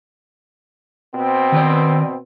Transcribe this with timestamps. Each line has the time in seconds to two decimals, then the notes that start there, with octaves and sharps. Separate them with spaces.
1.15 B2 C4
1.52 D#3 B4 D5